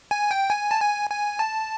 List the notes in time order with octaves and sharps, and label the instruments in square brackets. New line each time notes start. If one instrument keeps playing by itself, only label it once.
[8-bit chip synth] G#5
G5
G#5
A5
G#5
G#5
A5